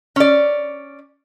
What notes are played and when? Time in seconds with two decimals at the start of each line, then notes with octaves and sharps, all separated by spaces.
0.16 C#4 D5